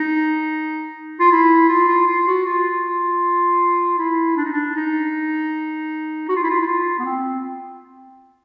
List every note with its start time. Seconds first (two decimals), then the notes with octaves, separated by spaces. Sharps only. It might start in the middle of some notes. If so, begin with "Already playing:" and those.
Already playing: D#4
1.20 F4
1.32 E4
1.69 F4
1.89 F4
2.08 F4
2.27 F#4
2.45 F4
3.99 E4
4.37 D4
4.45 D#4
4.53 D4
4.76 D#4
6.29 F#4
6.36 F4
6.43 E4
6.50 F4
6.62 E4
6.67 F4
6.99 B3
7.05 C4